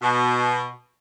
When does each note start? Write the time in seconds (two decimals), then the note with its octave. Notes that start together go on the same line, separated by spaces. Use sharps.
0.02 B2